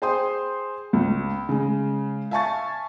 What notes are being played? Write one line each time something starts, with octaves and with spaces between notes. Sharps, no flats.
G#4 C5 G5 C6 D#6
C#2
C#3 G#3
E5 F5 G#5 A5 C#6 A6